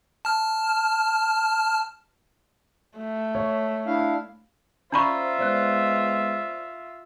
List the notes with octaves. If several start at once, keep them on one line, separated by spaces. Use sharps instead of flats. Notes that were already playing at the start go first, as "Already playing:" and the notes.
A5 F6
A3
C#5
D4 E4 F5
C#4 F4 C5 D5 E5 A#5 B5 C#6
G#3 B3 C5 D5 F#6